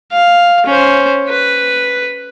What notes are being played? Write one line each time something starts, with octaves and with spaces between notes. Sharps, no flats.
F5
C#4 C5
B4